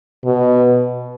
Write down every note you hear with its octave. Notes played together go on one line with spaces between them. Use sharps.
B2